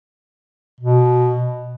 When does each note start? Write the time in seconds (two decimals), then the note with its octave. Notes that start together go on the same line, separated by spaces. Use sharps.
0.81 B2